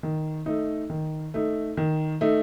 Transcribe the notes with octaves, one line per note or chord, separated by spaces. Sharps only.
D#3
A3 D#4
D#3
A3 D#4
D#3
A3 D#4